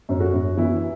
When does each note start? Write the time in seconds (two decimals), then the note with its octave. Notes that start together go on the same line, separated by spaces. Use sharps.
0.09 F#2
0.20 F#4
0.33 F#2
0.57 E3 E4